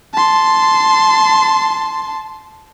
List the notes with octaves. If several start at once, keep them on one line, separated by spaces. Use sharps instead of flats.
A5 C6